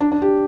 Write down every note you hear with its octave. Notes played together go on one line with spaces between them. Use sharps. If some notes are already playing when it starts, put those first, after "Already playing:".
D4
D4
G4